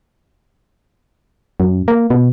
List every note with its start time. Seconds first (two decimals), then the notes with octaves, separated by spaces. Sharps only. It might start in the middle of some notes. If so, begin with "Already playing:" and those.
1.60 F#2
1.88 A#3
2.10 B2